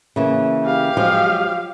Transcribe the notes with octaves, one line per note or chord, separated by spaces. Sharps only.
C#3 E3 A#3
G4 F5
F3 F#3 G#3